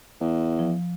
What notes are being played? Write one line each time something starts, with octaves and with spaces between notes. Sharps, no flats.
E2
F3